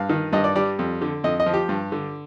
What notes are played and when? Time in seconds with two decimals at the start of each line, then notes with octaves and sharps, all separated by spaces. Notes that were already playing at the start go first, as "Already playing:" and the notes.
Already playing: G2 F5
0.09 D#3
0.33 G2 D#5
0.44 D5
0.56 G3 D5
0.79 F2
1.01 D3
1.24 F2 D#5
1.40 D#5
1.46 F3
1.54 G4
1.69 G2
1.92 D3